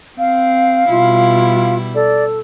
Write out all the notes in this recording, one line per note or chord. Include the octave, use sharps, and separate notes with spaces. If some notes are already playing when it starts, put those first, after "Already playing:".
C4 F5
B2 G3 E4 F4
A4 D5